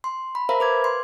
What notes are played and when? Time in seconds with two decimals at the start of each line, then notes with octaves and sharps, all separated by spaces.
0.04 C6
0.35 B5
0.49 A#4 C5 E5 F5 A#5 B5
0.60 B4 D6 G#6
0.84 C6